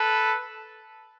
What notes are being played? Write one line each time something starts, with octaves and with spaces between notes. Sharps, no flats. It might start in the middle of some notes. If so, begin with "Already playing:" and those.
Already playing: A4 B4